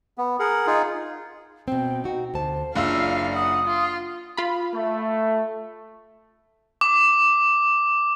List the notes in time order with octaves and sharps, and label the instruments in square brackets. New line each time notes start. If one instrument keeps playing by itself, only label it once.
[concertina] B3
G#4 A#4 F#5
D#4 F4 G#4
[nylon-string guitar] B2 C4 [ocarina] G5
[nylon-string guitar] D#4 F#4
[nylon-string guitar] D2 A5 [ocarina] C5
[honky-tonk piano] F#1 F4 E6 [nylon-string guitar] D4 [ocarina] D5 [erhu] F5
[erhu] F#5 [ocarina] D#6
[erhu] F4
[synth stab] F4 B5
[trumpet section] A3
[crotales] D6